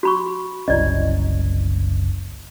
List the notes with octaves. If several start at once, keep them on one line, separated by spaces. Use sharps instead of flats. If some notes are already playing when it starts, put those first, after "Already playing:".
F#4 B5 C#6
F#1 C2 C#4 E4 D5 D#5